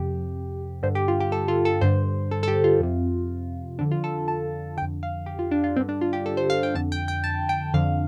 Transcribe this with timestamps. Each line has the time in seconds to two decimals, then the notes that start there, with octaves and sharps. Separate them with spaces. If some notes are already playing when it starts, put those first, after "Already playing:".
Already playing: F2 C3 G4
0.83 G2 D3 C5
0.95 G4
1.08 F4
1.20 G4
1.32 A4
1.48 F4
1.65 A4
1.81 G2 D3 C5
2.31 A4
2.43 A4
2.48 G4
2.64 F4
2.80 F2 C3
3.79 F2 D3 D4
3.92 F4
4.04 A4
4.28 A5
4.77 D3 G5
4.82 F2
5.03 F5
5.26 G4
5.39 F4
5.51 D4
5.64 F4
5.76 G2 C4
5.80 D3
5.89 D4
6.01 F4
6.13 G4
6.26 A4
6.37 C5
6.50 F5
6.63 G5
6.75 F2 D3 A5
6.92 G5
7.08 G5
7.24 A5
7.49 G5
7.74 F2 D3 F5